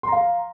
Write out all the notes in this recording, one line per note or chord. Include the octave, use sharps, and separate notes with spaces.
F5 A#5 C6